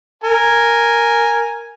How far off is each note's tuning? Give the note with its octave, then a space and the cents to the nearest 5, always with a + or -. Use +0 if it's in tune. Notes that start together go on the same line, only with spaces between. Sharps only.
A#4 +0 G#5 +0